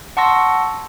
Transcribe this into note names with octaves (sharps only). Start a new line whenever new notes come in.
F#5 A5 C6 C#6 E6 A#6